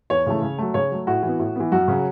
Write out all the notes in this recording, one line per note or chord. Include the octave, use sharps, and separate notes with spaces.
E2 C#5
C#3 E3 A3
C#3
F#3 A3
C#3 C#5
F#3 A3
A2 F#4
E3
B3
A2
E3 B3
F#2 F#4
C#3 F#3